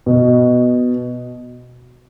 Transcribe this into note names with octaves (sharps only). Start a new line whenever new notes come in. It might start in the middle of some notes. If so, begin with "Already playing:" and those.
B2